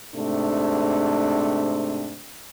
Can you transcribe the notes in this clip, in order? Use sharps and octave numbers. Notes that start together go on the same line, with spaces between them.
G#2 C3 A3 D4